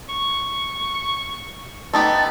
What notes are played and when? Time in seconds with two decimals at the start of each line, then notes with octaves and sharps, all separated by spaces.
0.09 C#6
1.93 A3 B3 D#4 G4 A6